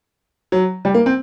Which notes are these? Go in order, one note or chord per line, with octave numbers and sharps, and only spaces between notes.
F#3
G3
A#3
C4